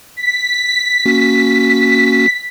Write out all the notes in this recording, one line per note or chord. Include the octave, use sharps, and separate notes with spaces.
B6
A#3 C#4 F#4